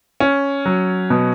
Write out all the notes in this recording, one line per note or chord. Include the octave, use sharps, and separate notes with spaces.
C#4
F#3
B2